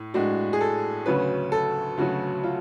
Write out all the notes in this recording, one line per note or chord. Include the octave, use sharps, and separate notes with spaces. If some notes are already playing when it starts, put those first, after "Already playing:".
Already playing: A2
A2 G#3 D4 F#4
G#4
A4
D2 C#3 F#3 C#4 B4
A4
D2 C#3 F#3 C#4 F#4
F4